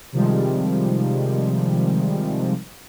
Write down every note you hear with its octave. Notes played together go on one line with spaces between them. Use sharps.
C3 D#3 F3 G3 G#3